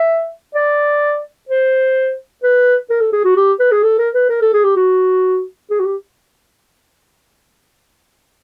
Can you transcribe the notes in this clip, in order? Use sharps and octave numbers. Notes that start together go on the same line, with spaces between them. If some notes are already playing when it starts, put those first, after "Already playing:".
Already playing: E5
D5
C5
B4
A#4
A4
G#4
F#4
G4
B4
G#4
A4
A#4
B4
A#4
A4
G#4
G4
F#4
G#4
F#4
G4